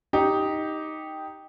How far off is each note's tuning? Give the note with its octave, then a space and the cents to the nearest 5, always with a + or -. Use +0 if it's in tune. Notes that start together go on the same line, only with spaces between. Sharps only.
D#4 +5 G4 +0